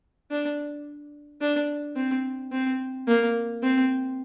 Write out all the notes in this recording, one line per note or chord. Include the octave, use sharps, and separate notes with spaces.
D4
D4
C4
C4
A#3
C4